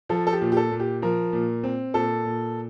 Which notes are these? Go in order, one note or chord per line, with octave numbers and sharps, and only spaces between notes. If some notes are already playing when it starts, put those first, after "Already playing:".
F3 A4
A4
G4
A#2
G4
A4
A#2
G4
F3 A#4
A#2
C4
A#2 A4
A#2